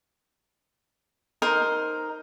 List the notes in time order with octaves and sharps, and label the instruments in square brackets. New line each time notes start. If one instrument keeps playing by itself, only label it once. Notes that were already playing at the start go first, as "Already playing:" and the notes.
[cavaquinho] D#4 A#4 C5